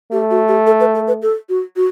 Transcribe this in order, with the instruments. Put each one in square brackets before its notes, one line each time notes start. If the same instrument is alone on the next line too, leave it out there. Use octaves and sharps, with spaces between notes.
[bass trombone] A3 [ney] G4
[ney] F#4
G4
A4
B4
A4
B4
A4
F#4
F#4